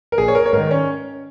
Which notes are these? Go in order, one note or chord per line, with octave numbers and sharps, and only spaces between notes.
A#4
A#1 G#4
C#5
A#4
C#5
G#2 D#3 A#4
C#4